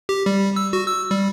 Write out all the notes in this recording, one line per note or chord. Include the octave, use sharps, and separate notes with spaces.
G4
G3
E6
F#4
E6
G3